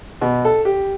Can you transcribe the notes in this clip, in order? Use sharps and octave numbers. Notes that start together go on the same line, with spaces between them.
B2
A4
G4